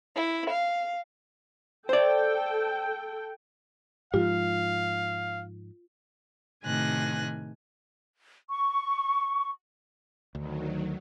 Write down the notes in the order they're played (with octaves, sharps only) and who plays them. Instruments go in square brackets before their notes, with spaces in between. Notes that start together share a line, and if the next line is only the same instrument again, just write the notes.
[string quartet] E4
F5
[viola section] A4 G5 [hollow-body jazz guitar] C5 D5
[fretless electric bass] G#2 F3 [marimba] F4 [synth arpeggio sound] G4 [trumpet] F5
[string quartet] A2 C3 D#3 G#5 F#6 A#6
[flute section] C#6
[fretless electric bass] D2 [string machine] D#3 F#3